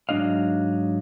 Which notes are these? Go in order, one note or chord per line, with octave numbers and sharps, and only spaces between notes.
G#2 F#3 G#3 D4 D#5 F5